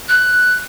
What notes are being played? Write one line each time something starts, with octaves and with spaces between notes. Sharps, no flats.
F#6